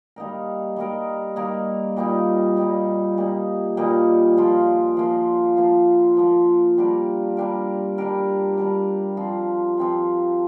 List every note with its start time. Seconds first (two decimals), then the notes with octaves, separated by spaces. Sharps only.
0.16 G3 A#3 D#4 A#4
0.76 G3 A#3 D#4 A#4
1.36 G3 A#3 D#4 A#4
1.97 A#2 G3 A#3 D#4
2.57 A#2 G3 A#3 D#4
3.17 A#2 G3 A#3 D#4
3.77 A#2 G3 A#3 D#4
4.37 F3 A#3 F4
4.97 F3 A#3 F4
5.57 F3 A#3 F4
6.17 F3 A#3 F4
6.78 G3 D4 G4 A#4
7.37 G3 D4 G4 A#4
7.98 G3 D4 G4 A#4
8.58 G3 D4 G4 A#4
9.17 F3 C4 F4
9.78 F3 C4 F4